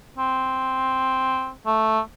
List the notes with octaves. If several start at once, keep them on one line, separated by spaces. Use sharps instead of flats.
C4
A3